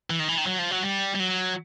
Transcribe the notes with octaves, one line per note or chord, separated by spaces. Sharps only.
E3
D#3
E3
D#3
F#3
F3
F#3
G3
G3
F#3